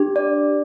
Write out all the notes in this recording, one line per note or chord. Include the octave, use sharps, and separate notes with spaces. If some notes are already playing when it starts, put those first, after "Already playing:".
Already playing: D4 G4
D5